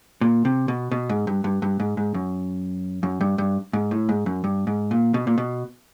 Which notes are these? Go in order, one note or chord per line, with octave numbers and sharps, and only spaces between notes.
A#2
C3
B2
B2
G#2
G2
G2
G2
G#2
G#2
F#2
F#2
G2
G2
G#2
A2
G#2
F#2
G2
G#2
A#2
B2
A#2
B2